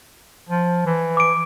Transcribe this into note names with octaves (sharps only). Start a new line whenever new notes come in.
F3
E3
D6 D7